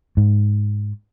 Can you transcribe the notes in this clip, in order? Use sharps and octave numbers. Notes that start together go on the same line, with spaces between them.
G#2